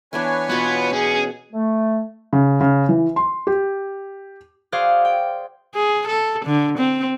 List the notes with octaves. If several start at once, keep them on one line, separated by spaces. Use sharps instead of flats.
E3 B3 D4 B4 C#5 G#5
B2 B3 F4 B5
C#4 G#4
A3
C#3
C#3
E3
C6
G4
F#4 G#4 C5 D5 F5
G5
G#4
A4
D3
C4